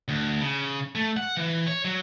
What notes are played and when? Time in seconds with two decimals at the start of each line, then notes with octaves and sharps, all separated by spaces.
0.08 D2
0.41 C#3
0.95 A3
1.17 F#5
1.37 E3
1.67 C#5
1.85 F#3